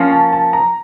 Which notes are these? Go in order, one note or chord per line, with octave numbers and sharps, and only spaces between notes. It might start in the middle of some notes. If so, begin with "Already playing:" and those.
Already playing: F3 A#3 C#4
A5
A5
A#5